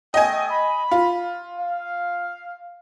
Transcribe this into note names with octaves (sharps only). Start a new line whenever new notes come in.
A3 D#5 G5 G#5 D#6
B5
F4
F5